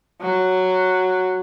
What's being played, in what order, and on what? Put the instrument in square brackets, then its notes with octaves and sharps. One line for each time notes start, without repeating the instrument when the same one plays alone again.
[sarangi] F#3